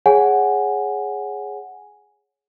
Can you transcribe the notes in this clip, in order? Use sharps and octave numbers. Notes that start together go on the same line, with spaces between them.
G#4 C#5 F#5 G#5